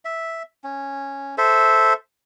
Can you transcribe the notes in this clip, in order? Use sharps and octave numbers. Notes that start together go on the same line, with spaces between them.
E5
C#4
A4 C5 E5